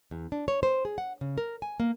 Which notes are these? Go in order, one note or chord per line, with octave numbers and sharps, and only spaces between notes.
E2
D4
C#5
C5
G#4
F#5
C#3
A#4
G#5
A#3